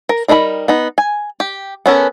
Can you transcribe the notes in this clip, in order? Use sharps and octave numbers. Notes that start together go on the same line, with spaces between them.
A#4
G3 D#4 A#4 A#5 B5
B3 D#4
G#5
G4
B3 C#4 A4 A#4